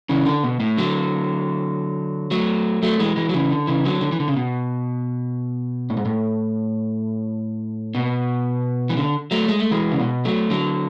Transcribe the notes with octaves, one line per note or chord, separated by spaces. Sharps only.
C#3 E3
D3
B2
A2
D3 F#3
F#3 A3
F#3 A3
E3 G#3
E3 G#3
F#3
C#3 E3
D3
C#3 E3
D3 F#3
D3
E3
D3
C#3
B2
A2
G#2
A2
B2
E3
D3
F#3 A3
G#3
A3
E3 G#3
C#3
B2
F#3 A3
D3 F#3